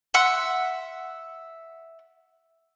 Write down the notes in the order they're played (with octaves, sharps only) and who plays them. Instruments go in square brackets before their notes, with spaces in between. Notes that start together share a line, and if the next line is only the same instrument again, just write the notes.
[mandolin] E5 F#5 C6